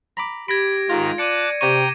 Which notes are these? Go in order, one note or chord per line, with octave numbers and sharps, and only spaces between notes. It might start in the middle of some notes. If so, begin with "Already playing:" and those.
A#5 B5 D6
G4 B5 G#6 A#6 D7
G#2 D#3 F4 A#5
D5 A5 D6 F#6 C#7 D#7
C3 G5 A#5 C#6 D6 D#7